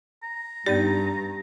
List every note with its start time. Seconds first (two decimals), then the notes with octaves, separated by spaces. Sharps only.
0.23 A#5
0.66 G2 B3 D#4 G4 D5 A6